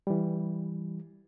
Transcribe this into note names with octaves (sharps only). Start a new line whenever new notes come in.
E3 G3